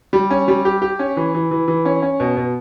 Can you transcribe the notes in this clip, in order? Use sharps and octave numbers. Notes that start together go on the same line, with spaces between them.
G3
C#4
G3
G4
G4
C#4
E3
E3
E3
E3
C#4
C#4
B2
B2